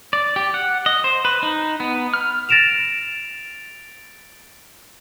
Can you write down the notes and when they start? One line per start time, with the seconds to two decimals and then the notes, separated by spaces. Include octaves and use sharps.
0.13 D5
0.36 G4
0.54 F#5
0.86 D#5
1.04 C5
1.25 B4
1.43 D#4
1.80 B3
2.14 F6
2.49 A6 A#6 D7 E7 F7